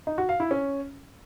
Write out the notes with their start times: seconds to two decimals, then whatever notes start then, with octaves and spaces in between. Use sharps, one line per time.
0.07 D#4
0.18 F#4
0.29 F5
0.40 E4
0.51 C#4